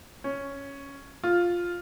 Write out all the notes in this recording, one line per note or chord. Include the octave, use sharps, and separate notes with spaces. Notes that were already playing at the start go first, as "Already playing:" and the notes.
C#4
F4